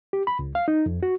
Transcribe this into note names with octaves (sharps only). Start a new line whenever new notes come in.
G4
B5
C#2
F5
D#4
F2
F#4